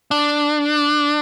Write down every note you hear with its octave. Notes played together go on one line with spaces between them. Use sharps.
D4